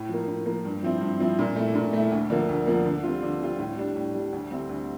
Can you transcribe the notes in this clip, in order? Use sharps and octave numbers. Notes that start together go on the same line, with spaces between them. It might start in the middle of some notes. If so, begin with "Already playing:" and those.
Already playing: A2
F3 A#3
A2
F3 A#3
G2
F3 C4 E4
G2
F3 C4 E4
A#2
A3 E4
A#2
A3 E4
D2
D3 F3 A#3
D2
D3 F3 A#3
D3
G3 C4 F4
D3
G3 C4 F4
A2
G3 D4
A2
G3 D4
D2
D3 G3 C4 E4
D2